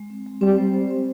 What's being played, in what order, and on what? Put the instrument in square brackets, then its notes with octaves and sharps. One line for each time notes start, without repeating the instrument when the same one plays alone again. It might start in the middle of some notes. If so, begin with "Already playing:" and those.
Already playing: [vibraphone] G#3
C4
G#3
[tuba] G3 [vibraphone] C4
[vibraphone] C5
C5
C4